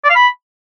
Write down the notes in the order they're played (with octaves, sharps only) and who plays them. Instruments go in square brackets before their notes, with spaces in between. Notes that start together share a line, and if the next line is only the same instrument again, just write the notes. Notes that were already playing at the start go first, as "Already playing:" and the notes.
[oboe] D5
F5
B5